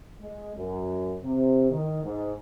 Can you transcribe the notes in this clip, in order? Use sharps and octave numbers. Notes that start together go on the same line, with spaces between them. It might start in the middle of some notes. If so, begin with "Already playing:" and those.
G#3
F#2
C3
D#3
G#2